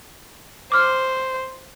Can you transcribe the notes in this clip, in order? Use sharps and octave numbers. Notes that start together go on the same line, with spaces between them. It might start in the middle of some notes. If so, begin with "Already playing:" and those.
C5 D6 F6